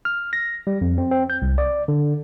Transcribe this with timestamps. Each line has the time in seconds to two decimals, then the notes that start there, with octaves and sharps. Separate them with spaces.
0.05 F6
0.33 A#6
0.67 G3
0.81 F2
0.98 C4
1.11 C4
1.30 G6
1.42 C2
1.58 D5
1.88 D3